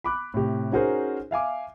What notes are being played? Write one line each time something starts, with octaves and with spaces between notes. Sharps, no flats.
B5 D6 F#6
A2 C3 G4
C#4 D#4 F#4 G#4 A#4 C5
E5 F5 G#5 D6